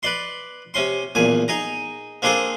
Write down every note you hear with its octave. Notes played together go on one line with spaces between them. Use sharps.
B4 D5 C6
C3 C#4 C6
B1 E2 A#2 G#5
D#4 G#4 A#5
A#3 C4 D4 G#4 A4 C5